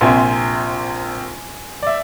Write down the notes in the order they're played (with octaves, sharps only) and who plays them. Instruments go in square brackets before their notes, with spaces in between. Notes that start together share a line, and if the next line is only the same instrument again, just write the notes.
[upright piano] A#1 C3 [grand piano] E5 G#5 C6
[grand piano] D5 E5